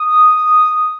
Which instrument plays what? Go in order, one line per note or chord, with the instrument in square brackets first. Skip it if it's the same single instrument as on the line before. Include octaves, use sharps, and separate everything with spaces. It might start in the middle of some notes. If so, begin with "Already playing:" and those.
Already playing: [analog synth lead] D#6